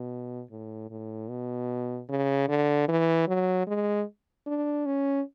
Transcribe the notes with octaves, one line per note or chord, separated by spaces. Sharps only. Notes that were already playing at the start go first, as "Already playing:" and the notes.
Already playing: B2
A2
A2
B2
C#3
D3
E3
F#3
G#3
D4
C#4